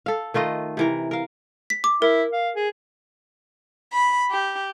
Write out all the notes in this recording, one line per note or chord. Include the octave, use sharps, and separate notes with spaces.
A4 F5
D#3 A3 F4 D#5
C3 E3 A#4
A#4 F5
B6
D6
E4 A#4
F5
G#4
B5
G4